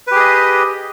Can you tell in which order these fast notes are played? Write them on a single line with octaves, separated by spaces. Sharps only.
B4 G4 G#4 D#5